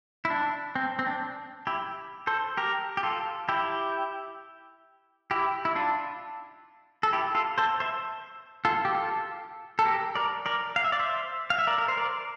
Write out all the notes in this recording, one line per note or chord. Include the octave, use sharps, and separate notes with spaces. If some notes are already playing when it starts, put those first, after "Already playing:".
E4
D4
C4
C4
D4
E4 G4
A4 C5
G4 A#4
G4
F4 A4
E4 G4
E4 G4
E4
D4 F4
A4
E4 G4
F4 A4
A4 C5
C5 E5
F4 A4
G4
F4 A4
A4
G4 A#4
A#4 D5
A#4 D5
F5
E5
D5
C5 E5
F5
E5
A#4 D5
A#4
C5
A#4 D5